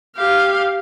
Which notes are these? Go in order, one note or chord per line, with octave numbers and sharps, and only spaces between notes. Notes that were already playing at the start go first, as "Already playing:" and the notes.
G4 F5